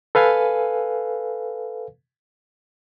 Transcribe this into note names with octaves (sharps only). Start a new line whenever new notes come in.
A4 B4 F5 G#5